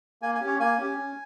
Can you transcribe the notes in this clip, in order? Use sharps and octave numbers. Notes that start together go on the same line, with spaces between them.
A#3 G#5
G#5
C#4 G4
C#5
A#3 G#5
C#4 G4
C#4